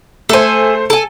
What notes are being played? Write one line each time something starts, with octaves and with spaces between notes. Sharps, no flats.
A3 A4 C5 G#5
A4 G#5